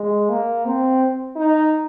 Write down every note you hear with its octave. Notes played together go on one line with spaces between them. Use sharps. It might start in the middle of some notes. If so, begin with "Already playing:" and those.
Already playing: G#3
A#3
C4
D#4